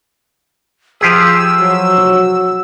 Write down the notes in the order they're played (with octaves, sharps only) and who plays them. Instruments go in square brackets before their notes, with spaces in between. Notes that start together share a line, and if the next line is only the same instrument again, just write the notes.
[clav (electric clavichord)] F3 G4 G#4 [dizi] E6
[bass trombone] F#3